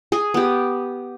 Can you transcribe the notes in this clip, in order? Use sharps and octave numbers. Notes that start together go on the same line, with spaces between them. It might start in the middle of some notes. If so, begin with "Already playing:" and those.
G#4 G#5
B3 G4